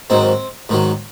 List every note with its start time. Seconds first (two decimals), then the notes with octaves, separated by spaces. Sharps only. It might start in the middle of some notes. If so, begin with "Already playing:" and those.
0.10 G#2 D#3 F#3 C4
0.69 G#2 D#3 F#3